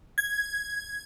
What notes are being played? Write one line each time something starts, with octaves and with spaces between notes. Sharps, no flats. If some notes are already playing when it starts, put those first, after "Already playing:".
G#6